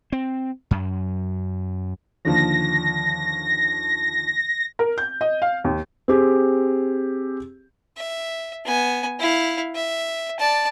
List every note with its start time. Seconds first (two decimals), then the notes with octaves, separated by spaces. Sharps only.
0.12 C4
0.71 F#2
2.25 D#2 D3 F3 A#6
4.79 A#4
4.98 G6
5.21 D#5
5.42 F5
5.64 D#2
6.08 C4 G4 G#4
7.97 E5
8.65 B3 G#5
9.19 E4 F5
9.75 E5
10.39 D5 A5